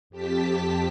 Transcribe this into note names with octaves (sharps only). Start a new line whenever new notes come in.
F2 G4 A5 B6